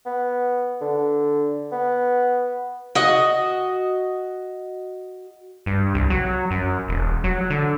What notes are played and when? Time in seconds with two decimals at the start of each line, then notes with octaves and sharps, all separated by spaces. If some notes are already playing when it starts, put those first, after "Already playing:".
0.06 B3
0.81 D3
1.72 B3
2.95 F#4 D#5
5.66 G2
5.94 C2
6.10 F#3
6.51 F#2
6.88 E1
7.24 F#3
7.50 D3